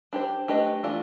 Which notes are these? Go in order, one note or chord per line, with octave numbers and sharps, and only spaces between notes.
D4 G4 C5
A3 D4 G4 B4 D#5
E3 A3 D4 F4